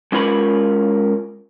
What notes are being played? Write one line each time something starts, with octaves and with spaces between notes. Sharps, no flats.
G#3 C#4 F4 A#4 B5